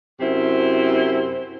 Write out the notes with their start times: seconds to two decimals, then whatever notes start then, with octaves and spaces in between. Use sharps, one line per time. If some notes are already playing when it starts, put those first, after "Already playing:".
0.21 F#2 C3 E4 C5